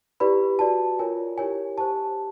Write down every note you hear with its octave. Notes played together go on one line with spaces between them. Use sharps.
E4 G4 B4 D5 B5
F#4 B4 D5 A5
F4 A#4 C#5 G#5
E4 G4 A#4 C#5 G#5
G4 C5 A5